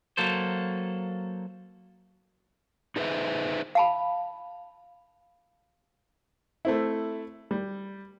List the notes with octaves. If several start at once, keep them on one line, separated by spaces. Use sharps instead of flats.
F#3 A#3 A4 C5
D#4 G#4 B4 C5 E5
F5 A5 B5
A3 C4 E4
G3